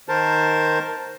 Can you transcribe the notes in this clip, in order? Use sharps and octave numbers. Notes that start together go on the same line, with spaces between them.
D#3 A#4 C5 A5